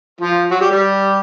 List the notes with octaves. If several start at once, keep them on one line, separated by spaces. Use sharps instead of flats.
F3 F4
F#3 F#4
G3 G4
G3 G4